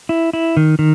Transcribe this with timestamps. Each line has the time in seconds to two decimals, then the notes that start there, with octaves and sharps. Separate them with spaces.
0.09 E4
0.33 E4
0.57 D#3
0.79 D#3